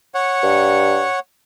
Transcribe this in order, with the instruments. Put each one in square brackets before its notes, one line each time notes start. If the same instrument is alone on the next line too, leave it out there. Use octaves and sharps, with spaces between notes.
[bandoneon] C#5 F#5
[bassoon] G2